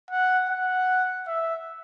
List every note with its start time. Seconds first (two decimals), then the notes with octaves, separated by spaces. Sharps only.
0.11 F#5
0.49 F#5
1.27 E5